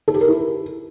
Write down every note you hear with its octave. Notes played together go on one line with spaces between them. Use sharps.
A4
G4
A#4
E4